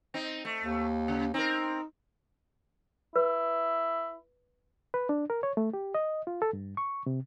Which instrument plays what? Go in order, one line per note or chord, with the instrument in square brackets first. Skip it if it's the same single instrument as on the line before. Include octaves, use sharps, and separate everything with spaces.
[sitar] C4 D#4
A3
[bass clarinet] D#2
[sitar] C#3
[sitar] C4 A#4 [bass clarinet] D#4
[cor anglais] E4 [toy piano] B4
[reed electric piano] B4
D4
A#4
C#5
A3
G4
D#5
F4
A4
G2
C#6
C3